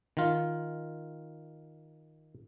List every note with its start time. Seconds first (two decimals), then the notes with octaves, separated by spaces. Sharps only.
0.17 D#3 F4